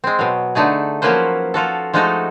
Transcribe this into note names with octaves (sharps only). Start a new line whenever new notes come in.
G#3 C4
B2 F#3
D3 A3 D#4 G#4
F3 F#3 A#3 C#4 B4 C5
F3 F4 F#4 A4
F3 G#3 A3 D#4 F#4 A4